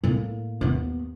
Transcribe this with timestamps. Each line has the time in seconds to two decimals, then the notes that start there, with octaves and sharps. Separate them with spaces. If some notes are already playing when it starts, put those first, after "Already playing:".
0.04 A2 A#3
0.61 D#2 B3